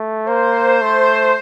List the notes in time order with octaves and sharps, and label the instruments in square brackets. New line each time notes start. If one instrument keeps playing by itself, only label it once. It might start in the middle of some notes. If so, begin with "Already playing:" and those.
Already playing: [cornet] A3
[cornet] A#3 [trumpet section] C5
[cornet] A3